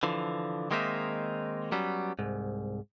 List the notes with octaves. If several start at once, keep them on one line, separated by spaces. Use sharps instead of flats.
D3 E3 F3
D#3 G#3 A#3 C4 D#4 E5
F#3 G3 B3 C#4
C2 G#2